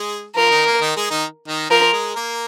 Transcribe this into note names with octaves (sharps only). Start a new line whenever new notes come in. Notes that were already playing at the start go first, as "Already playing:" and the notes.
Already playing: G#3 G#4
F3 F4 A#4
D#3 D#4
A#3
D#3 D#4
G#3 G#4
D#3 D#4
D#3 D#4
F3 F4 A#4
G#3 G#4
A#3 A#4